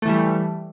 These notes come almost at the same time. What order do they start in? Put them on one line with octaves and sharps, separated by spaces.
A3 E3 G3